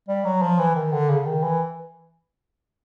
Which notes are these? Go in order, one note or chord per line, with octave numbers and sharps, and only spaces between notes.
G3
F#3
F3
E3
D#3
D3
C#3
D#3
E3